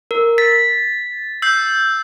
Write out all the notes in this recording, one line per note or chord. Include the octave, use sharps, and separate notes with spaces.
A#4
A6 B6
E6 G6 C7